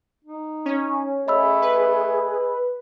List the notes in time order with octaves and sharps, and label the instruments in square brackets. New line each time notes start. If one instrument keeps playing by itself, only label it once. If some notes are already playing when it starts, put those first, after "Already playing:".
[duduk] D#4
[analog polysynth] C#4
[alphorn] A3 [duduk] G#4 [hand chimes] D#5 B5 E6
[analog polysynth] B4